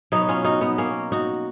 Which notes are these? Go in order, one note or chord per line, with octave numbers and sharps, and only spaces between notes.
B2 F#3 B3 D#4
C#4 F4
D#4 F#4
B3 D#4
A#3 C#4
D#4 F#4